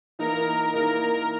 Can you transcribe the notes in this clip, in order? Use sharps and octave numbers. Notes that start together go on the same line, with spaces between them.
E3 A#3 D#4 A#4 A#5
E3 A#3 D#4 A#4 A#5